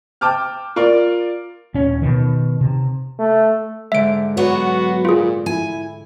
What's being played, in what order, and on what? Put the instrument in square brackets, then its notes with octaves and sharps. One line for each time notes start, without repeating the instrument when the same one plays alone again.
[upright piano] G5 A5 D6 F6
F4 A#4 D5
[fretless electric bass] D#1 C#4
B2 D#3
C3
[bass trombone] A3
[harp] G#2 D3 G#3 [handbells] E5 D7
[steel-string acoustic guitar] F#3 B3 C#5 [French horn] F#4
[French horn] A#2 [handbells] F4 G#4
[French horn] E4 [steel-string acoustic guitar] G#5